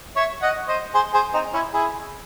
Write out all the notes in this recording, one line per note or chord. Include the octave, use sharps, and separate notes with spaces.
C#5 E5
D#5 F#5
C5 D#5
G#4 C5
G#4 C5
C4 D#4
C#4 E4
E4 G#4